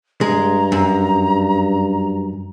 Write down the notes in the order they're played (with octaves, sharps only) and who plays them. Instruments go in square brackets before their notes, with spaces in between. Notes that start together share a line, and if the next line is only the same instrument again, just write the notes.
[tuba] G2 [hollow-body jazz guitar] G#3 [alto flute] A#5
[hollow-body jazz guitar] F#2